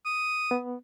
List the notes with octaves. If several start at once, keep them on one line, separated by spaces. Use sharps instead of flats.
D#6
B3